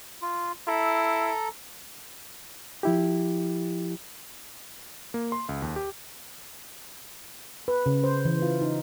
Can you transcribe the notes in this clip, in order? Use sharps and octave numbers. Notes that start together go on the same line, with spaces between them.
F4
E4 A4 A#5
F3 E4 G4
A#3
C6
C#2
D#2
G4
B4
C#3
C5
E3
F4
D#4